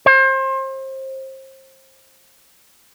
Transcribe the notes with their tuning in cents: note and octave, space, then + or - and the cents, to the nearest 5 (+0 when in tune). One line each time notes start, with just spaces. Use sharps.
C5 +30